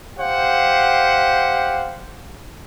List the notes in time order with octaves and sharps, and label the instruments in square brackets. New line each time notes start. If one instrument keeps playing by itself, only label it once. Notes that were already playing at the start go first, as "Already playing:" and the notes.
[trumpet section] G4 C5 F5 F#5